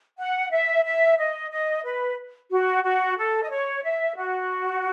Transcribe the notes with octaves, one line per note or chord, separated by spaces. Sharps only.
F#5
E5
E5
D#5
D#5
B4
F#4
F#4
A4
D#5
C#5
E5
F#4